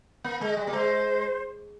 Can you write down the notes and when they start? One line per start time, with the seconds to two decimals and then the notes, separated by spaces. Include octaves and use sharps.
0.24 A#3
0.41 G#3
0.49 D#5
0.57 G3
0.67 A#3
0.73 G#3 C5